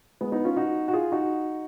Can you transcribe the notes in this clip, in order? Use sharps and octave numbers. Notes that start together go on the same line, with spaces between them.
G#3 B3
B3 D#4
C#4 F4
D#4 F#4
F#4
F4 G#4
D#4 F#4